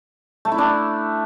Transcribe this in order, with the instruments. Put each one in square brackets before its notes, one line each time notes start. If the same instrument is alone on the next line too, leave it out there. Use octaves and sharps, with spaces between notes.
[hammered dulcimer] A3
E4
D4